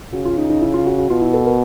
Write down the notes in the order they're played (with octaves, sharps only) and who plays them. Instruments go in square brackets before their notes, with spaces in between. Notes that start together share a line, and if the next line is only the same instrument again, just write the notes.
[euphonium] C#3 [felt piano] F#4
[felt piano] F4
D#4
D#4
E4
F4
F#4
F#4
[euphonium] B2 [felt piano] F4
[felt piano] E4
A4
A#4